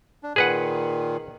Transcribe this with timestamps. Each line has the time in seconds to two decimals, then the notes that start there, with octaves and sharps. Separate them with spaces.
0.23 D4
0.36 A#2 D#3 G#4 B4 F#5